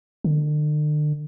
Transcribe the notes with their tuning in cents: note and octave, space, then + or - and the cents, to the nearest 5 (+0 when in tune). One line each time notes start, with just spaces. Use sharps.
D3 +40